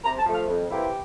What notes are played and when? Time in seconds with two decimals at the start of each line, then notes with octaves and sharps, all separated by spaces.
0.04 C3 A#5
0.19 A5
0.26 F3 A3
0.34 F5
0.48 F2
0.70 C3 E3 A#3 E4 G4